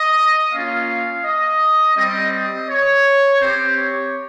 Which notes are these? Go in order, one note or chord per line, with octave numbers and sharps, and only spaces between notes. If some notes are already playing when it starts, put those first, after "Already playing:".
Already playing: D#5
A#3 C#4 F4 F5
D#5
G3 C4 G4 D#5
D#5
C#5
C4 G4 C5
C#5